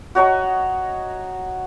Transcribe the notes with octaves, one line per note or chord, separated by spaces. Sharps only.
F#4 C#5 D#5 A#5